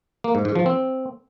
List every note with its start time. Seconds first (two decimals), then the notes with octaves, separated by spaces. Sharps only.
0.24 A#3
0.35 G#2
0.45 G#2
0.55 F3
0.66 C4